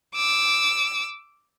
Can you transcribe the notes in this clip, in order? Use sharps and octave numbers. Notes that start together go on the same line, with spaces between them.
D6 E6